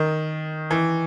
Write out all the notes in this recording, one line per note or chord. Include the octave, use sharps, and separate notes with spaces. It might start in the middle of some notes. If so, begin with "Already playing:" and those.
Already playing: D#3
E3